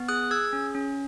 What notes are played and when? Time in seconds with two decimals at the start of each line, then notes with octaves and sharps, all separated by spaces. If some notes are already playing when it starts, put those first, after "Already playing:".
Already playing: B3
0.08 G#4 D#6 F#6
0.31 G#4 E6 G#6
0.53 C#4
0.75 C#4